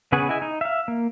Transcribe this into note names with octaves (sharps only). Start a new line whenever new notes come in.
C#3 B3 G#4 B4 C#5
E4 G#4 D#5 G#5
D#4
E5 F5
A#3